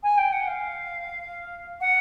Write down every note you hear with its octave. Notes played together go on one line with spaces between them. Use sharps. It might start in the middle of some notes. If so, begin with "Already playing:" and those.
G#5
G5
F#5
F5
F#5